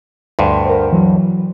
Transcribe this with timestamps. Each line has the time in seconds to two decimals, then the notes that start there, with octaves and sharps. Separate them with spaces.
0.39 D2 G2 C6
0.66 A#4 C5
0.92 E3 F#3